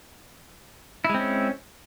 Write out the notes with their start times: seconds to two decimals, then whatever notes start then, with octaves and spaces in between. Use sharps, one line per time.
1.05 E4
1.09 G#3
1.14 C4
1.19 C#4